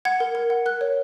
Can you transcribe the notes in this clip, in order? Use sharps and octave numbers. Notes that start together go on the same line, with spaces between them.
F#5 G#6
A#4
A#4
F#5
A#4 F#6
C#5